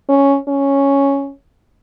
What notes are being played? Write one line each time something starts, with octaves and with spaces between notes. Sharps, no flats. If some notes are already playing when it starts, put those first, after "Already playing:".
C#4
C#4